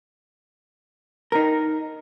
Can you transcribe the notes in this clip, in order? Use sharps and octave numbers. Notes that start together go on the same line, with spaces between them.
D#4 A#4